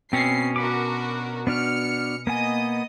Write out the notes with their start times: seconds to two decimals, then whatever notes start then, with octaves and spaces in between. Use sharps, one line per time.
0.13 B2 C4 C#4 C7
0.56 D4 F#4 A#4 B5 D6
1.47 B3 D4 F#4 F6 C#7
2.27 A#3 B3 D#5 G#5 D#6